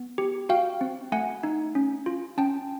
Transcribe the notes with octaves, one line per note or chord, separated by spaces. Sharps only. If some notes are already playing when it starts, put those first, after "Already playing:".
Already playing: B3
G4
F#4 F5 G5
C4
A3 F#5 G#5
D#4
C#4
F4
C#4 G5 A5